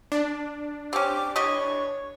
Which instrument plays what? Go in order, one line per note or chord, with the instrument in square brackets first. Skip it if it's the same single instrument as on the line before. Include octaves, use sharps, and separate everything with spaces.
[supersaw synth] D4
[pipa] C4 C#4 [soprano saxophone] G4 [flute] D6
[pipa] E3 G4 D#5 [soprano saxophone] C#5 [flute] C#6